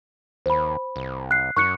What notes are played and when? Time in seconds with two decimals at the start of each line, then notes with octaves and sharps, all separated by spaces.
0.46 D#2 C5 B5
0.96 C2
1.31 F#6 C7
1.57 F#2 C#6 F#6 C#7